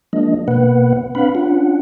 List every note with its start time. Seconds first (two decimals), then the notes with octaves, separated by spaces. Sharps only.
0.13 F3 G#3 A#3 D4 D#5
0.48 B2 A#3 B4 F#5
1.15 C4 D4 B4 F5 F#5 B5
1.35 C#4 D4 F4 F#5